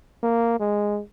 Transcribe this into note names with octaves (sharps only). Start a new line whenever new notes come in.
A#3
G#3